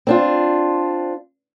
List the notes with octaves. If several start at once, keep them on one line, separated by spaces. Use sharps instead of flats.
C4 D4 F4